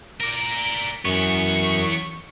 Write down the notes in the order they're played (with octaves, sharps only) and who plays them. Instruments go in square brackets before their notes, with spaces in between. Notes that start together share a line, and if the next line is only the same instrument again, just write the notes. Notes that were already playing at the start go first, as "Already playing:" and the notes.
[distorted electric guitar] A#4 D5
[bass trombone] F#2 [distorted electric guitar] E3 B3 [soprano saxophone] C#6